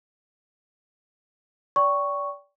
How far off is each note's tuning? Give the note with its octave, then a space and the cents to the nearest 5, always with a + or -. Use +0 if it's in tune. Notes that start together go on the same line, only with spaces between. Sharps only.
D5 -30 G5 +0 C#6 +0